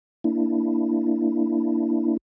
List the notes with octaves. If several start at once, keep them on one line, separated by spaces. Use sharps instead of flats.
A#3 D4 E4